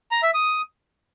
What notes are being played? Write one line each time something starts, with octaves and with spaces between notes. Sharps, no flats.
A#5
E5
D#6